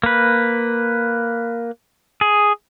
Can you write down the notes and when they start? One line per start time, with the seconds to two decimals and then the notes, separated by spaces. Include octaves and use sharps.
0.03 A#3 B4
2.21 G#4